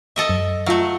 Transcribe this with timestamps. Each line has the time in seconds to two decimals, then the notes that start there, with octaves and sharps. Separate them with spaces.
0.16 A4 D#5 E5
0.29 F#2
0.66 F#3 A3 F4 E5 F5